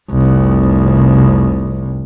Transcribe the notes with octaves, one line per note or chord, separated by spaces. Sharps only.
F1 C2